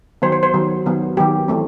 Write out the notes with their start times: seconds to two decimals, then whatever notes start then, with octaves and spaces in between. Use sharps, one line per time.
0.22 D#3 F#3 B3 C5
0.32 C5
0.43 C5
0.54 D#3 F#3 B3
0.86 D#3 F#3 B3
1.17 D#3 F#3 B3 G4
1.48 E3 A3 C4